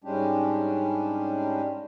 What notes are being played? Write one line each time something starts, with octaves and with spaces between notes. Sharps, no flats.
G#2 G3 G#3 C#4 D4 G4